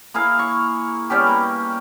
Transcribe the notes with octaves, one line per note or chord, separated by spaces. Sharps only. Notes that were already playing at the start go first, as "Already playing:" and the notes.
A#3 E4 G#4 F5
C#6
G3 B3 C#4 G4
A#3